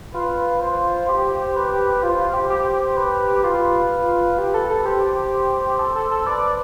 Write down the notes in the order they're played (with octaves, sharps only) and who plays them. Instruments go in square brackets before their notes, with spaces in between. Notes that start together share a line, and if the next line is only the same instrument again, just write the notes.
[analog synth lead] F4 [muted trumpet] B4
[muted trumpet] C5
[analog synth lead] G4 [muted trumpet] C5
[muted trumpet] B4
[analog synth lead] F4 [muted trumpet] C5
[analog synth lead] F4
G4
G4
[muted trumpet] B4
[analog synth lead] F4 [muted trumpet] B4
[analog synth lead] G4
A4
A4
[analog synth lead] G4 [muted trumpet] C5
[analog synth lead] A4
A4
A4
[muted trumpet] B4 [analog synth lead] D5